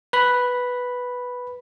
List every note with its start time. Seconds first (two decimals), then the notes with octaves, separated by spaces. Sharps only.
0.13 B4 B5